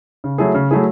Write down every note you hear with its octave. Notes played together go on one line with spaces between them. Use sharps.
C#3
F#3 A3 E4 G#4
C#3
F#3 A3 E4 G#4